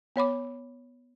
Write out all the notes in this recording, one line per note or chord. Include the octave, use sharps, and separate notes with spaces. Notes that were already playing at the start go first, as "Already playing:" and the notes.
B3 C#5 B5 D6